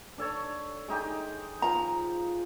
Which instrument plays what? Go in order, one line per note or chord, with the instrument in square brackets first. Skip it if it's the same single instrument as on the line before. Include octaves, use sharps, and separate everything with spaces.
[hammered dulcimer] D4 A4 C#5
G#3 D#4 G4
[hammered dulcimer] F3 [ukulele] A#5